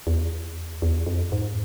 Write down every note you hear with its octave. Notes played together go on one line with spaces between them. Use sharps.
E2
E2
F2
G#2